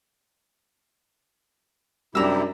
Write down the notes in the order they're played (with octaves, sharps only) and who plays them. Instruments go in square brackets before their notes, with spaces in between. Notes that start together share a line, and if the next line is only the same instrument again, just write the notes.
[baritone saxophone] F#2 [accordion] C3 E4 G4 [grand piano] G3 D4 [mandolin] A#5 E6